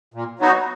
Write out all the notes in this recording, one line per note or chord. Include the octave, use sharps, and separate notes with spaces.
A#2
F#3 B3 D#4 F#4